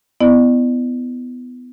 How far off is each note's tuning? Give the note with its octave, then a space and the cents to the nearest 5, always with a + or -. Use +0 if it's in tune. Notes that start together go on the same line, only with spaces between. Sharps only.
B3 +15 E4 +0 D5 +40